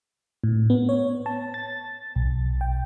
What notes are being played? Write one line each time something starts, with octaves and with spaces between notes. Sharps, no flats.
A2
B3
C#5
A5
A6
B1
G5